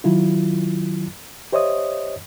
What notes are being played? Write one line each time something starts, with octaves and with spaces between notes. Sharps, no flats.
D#3 F#3 E4 F4
G4 C5 C#5 D#5 E5 D#6